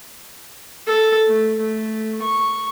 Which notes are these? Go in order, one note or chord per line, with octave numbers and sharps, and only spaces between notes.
A4
A3
A3
C#6